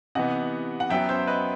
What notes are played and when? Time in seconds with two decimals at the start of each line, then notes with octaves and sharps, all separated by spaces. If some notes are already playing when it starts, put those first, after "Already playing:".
0.15 C3 E3 B3 D#5 F#5
0.80 F#5
0.90 F#2 F#3 B3 E5 G5
1.09 C5 E5
1.27 B4 D#5